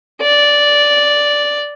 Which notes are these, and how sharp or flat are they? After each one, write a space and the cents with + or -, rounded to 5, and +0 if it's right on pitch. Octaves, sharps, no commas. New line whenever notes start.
D5 -5